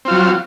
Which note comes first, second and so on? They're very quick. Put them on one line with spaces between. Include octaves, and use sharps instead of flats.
C4 F4 F#3